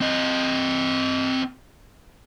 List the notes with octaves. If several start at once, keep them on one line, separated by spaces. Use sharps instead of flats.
C4 D#5